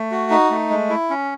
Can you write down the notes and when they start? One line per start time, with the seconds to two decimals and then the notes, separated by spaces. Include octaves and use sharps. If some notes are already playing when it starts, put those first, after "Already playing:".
Already playing: A3
0.11 F#4
0.31 D#4
0.51 A3
0.70 G#3
0.90 E4
1.10 C#4